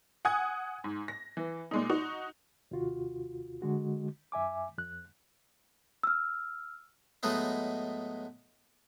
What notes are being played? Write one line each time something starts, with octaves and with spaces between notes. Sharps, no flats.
F#5 G#5 D#6 G#6
G#2
A#6
E3
A#2 G#3 D#4
D#4 F#4
D#2 C3 F4 F#4
D3 G#3 F#4
F#2 E5 G#5 D6
F2 F#6
E6 F6
A2 F#3 G#3 A3 B3 D#4